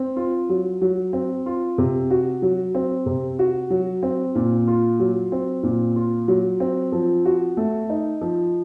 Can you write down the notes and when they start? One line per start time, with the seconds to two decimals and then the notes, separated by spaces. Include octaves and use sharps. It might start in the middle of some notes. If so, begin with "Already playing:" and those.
Already playing: C4
0.17 F4
0.49 F#3
0.82 F#3
1.13 C4
1.46 F4
1.78 C3
2.11 F#4
2.42 F#3
2.75 C4
3.06 C3
3.39 F#4
3.70 F#3
4.03 C4
4.35 A#2
4.67 F4
5.00 F#3
5.32 C4
5.63 A#2
5.96 F4
6.28 F#3
6.60 C4
6.92 F3
7.25 F#4
7.57 A3
7.89 D#4
8.21 F3